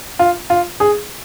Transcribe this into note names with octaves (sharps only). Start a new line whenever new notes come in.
F4
F4
G#4